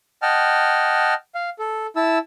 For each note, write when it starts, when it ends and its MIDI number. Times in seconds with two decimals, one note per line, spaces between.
0.22 1.14 75
0.22 1.14 78
0.22 1.14 79
0.22 1.14 81
0.22 1.14 89
1.35 1.50 77
1.59 1.87 69
1.96 2.18 64
1.96 2.18 81
1.96 2.18 88